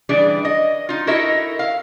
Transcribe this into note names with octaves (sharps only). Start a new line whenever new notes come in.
E3 G3 D4 G#4 D5
D#5
D#4 F4
E4 F#4 A4 A#4 D#5 E5
F5